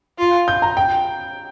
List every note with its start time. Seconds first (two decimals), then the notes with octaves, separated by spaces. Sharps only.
0.18 F4
0.48 G6
0.62 A#5
0.77 G5